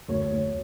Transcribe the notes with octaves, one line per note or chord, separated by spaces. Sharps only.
D2 C#5
D2